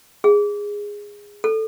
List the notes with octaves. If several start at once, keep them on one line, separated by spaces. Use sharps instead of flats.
G#4
A4